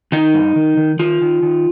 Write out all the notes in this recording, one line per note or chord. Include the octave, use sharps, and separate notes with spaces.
D#3 D#4
G2
D#3
D#3
D#3 F4
D#3
D#3